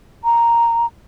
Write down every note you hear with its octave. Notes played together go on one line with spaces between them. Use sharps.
A#5